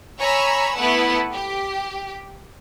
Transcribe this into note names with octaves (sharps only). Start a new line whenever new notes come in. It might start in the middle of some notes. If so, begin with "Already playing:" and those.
C#5 G#5 A#5 B5 C#6 E6
A3 B3 E4 B4 F#5
G4